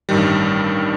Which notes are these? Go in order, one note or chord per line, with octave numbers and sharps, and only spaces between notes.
A1 G2 D#3 G3